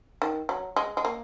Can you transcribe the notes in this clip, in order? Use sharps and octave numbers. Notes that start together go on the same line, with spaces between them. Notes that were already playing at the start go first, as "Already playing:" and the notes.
D#3
F#3
G#3
G#3
A#3